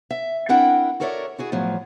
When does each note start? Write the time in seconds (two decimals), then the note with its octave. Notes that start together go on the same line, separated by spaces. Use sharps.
0.11 E5
0.49 C4 D4 E4 A#4 F#5 G5
1.00 F#4 A4 A#4 C#5 D5 E5
1.38 E4 F#4 G#4
1.52 E2 A2 F3 F#3